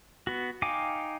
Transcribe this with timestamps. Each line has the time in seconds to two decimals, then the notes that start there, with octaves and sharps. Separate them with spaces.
0.27 B3 F#4
0.62 D#4 F5 G5 G#5 D6